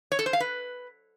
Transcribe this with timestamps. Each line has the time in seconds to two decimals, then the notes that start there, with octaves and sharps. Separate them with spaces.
0.12 C#5
0.19 A4
0.26 C5
0.33 F5
0.40 B4